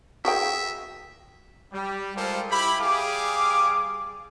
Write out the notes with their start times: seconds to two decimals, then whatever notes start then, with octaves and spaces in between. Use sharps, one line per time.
0.25 F#4 G#4 E5 G5
1.73 G3
2.16 G3 G#3 F4 A4 A#4 C5
2.51 E4 G4 B5
2.80 G3 G#4 F5 D6